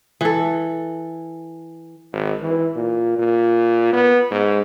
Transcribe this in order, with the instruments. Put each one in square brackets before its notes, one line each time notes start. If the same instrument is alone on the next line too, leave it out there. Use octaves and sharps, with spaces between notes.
[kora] E3 A4
[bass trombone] G#1
E3
A#2
A#2
B3
G#2